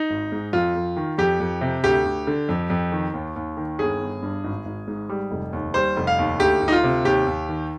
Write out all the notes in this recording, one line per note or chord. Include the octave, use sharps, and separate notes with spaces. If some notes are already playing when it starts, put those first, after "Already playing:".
Already playing: D#4
G#1
G#2
F2 F4
F2
D#3
F2 G4
F2
C3
D2 G4
D2
D3
F2
F2
D#3
D#2
D#2
D#3
G1 G#4
G1
G2
G#1
G#1
G#2
G3
F1
D#2
G3 C5
F1
F5
D#2
D2 G4
D2
D#4
F4
C3
D#2 G4
D#2
D#3